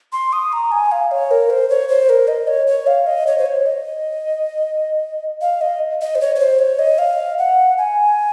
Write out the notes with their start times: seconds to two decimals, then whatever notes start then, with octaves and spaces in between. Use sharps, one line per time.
0.12 C6
0.33 D#6
0.53 A#5
0.72 G#5
0.92 F5
1.11 C#5
1.31 A#4
1.50 C5
1.70 C#5
1.89 C5
2.09 A#4
2.28 D#5
2.48 C#5
2.67 C#5
2.87 F5
3.07 D#5
3.27 C#5
3.38 C5
3.46 C#5
3.66 D#5
5.41 F5
5.61 D#5
6.01 D#5
6.15 C5
6.21 C#5
6.36 C#5
6.39 C5
6.59 C#5
6.79 D#5
6.98 F5
7.38 F#5
7.78 G#5